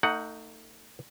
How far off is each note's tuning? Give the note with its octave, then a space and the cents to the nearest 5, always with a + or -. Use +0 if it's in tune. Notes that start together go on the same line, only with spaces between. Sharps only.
A3 +30 D#4 +0 F#5 +0